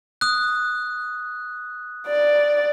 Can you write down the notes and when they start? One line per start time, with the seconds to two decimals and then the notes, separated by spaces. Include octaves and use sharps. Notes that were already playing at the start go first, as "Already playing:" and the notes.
0.21 D#6 F#6
2.07 D5